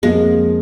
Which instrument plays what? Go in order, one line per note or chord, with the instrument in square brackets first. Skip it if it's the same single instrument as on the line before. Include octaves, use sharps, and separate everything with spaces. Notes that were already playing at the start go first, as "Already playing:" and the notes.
[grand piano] F2 F3 A#3 F4 [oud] G#3